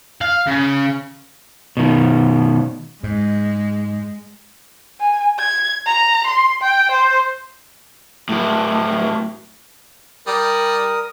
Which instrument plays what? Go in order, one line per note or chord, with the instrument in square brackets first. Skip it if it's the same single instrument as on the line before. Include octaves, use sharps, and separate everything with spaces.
[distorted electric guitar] F5
C#3
[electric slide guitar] B2 D#3
[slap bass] G#2 [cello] G#3
[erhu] G#5
G#6
A#5
C6
G5
C5
[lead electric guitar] A2 F#3
[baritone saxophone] G3 [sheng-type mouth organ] A#4 D#6